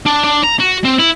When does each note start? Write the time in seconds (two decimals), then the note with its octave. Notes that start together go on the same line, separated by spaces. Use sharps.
0.06 D4
0.24 D4
0.44 A#5
0.60 F#4
0.85 C4
1.00 E4